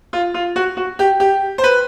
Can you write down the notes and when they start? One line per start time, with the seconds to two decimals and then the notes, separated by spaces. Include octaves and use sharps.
0.13 F4
0.34 F4
0.56 F#4
0.77 F#4
0.99 G4
1.20 G4
1.58 C5
1.64 B4